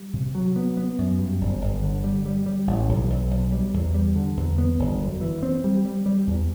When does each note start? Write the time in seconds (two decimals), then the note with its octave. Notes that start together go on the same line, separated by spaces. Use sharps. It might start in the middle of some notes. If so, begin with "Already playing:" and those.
Already playing: G3
0.13 C3
0.35 F#3
0.56 B3
0.77 B3
0.98 F#2
1.19 G2
1.41 G1
1.61 G1
1.83 D3
2.04 G3
2.26 G3
2.46 G3
2.67 A1
2.89 B1
3.10 B1
3.31 B1
3.52 G3
3.74 E2
3.94 G3
4.16 D3
4.37 E2
4.58 B3
4.79 G1
5.00 F#2
5.21 E3
5.43 C4
5.64 G3
5.85 G3
6.06 G3
6.27 E2